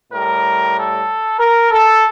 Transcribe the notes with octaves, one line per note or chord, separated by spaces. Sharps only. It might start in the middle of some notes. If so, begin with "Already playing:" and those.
A2 G3 A#4
A4
A#4
A4